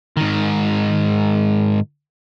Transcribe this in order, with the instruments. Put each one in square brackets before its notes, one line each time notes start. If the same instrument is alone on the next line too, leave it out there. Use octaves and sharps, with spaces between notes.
[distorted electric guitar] G#2 D#3